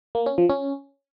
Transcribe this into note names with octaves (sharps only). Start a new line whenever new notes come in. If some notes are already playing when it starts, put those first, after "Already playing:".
A#3
C#4
F3
C#4